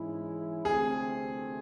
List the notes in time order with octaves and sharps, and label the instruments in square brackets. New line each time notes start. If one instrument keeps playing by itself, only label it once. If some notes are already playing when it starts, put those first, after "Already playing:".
Already playing: [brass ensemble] G#2 E3 G#3 C#4 E4
[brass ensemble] D2 C3 E3 A3 C4 [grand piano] G#4